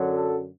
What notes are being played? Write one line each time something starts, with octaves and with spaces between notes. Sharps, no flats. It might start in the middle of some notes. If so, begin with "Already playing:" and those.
Already playing: F#2 D3 F#3
A4